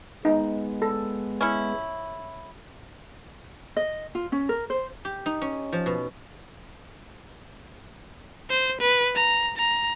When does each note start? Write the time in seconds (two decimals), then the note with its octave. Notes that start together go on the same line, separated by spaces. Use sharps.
0.25 G#3 B3 D#4
0.82 A4
1.41 C#4 E4
3.77 D#5
4.15 F4
4.32 C#4
4.49 A#4
4.70 C5
5.05 G4
5.26 D#4
5.42 C#4
5.73 F3
5.86 B2
8.50 C5
8.81 B4
9.15 A#5
9.57 A#5